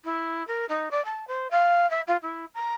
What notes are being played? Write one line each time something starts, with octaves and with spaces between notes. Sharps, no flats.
E4
A#4
D#4
D5
A5
C5
F5
E5
F4
E4
A#5